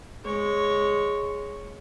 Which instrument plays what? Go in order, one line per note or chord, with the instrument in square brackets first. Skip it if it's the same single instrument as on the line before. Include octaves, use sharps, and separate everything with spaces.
[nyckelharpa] G#3 C#5